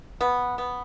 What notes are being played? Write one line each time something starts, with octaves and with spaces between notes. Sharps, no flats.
B3
B3